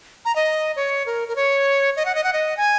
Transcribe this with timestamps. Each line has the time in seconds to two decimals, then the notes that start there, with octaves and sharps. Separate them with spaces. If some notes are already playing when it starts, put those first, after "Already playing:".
0.25 A#5
0.36 D#5
0.76 C#5
1.06 A#4
1.28 A#4
1.36 C#5
1.96 D#5
2.05 F#5
2.15 D#5
2.24 F#5
2.33 D#5
2.57 G#5